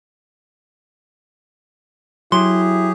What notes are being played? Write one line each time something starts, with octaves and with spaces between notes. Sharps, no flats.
F#3 E4 G4 G#4 C6